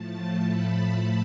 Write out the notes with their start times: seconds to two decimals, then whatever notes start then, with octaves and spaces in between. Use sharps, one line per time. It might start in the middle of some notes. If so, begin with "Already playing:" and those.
Already playing: A2 F3 A3 A5
0.42 B5